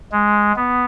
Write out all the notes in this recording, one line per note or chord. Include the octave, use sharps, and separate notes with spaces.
G#3
B3